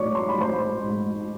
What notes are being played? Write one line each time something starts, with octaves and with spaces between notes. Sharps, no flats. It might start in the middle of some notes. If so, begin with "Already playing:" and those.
Already playing: A1 C#5 D5 C#6 D6
C6
B5
A1 C5 C6
G#2